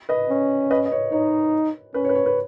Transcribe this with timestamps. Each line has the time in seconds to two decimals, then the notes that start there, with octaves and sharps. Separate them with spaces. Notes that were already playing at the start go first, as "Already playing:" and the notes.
0.09 B4 D#5
0.30 C#4
0.71 B4 D#5
0.86 D#5
0.92 C#5
1.12 D#4 C#5
1.94 C#4 B4
2.05 C#5
2.09 B4
2.15 C#5
2.26 B4